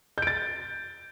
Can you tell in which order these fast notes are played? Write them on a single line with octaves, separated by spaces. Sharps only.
G6 D7 A6